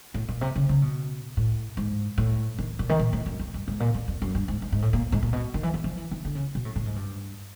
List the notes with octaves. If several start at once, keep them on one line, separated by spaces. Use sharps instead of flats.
A2
A#2
C3
C#3
C#3
B2
A2
G#2
A2
D#3
A#2
D#3
A#2
A2
F#2
F2
G2
G#2
A#2
F2
F2
F#2
G2
G#2
G#2
G#2
A2
A#2
G#2
A#2
B2
D#3
E3
F3
F3
E3
D#3
D3
C#3
B2
A2
A2
G#2
G2